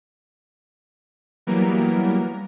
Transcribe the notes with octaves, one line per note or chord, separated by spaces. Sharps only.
E3 F#3 G3 A#3 B3 A#4